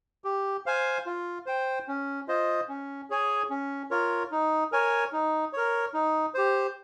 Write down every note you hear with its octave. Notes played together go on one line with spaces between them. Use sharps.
G4
C5 F5 G#5
F4
C5 G5
C#4
F4 C5 D#5
C#4
G#4 C#5 G#5
C#4
F4 A#4 C#5
D#4
A#4 C#5 G#5
D#4
A#4 C#5
D#4
G4 C5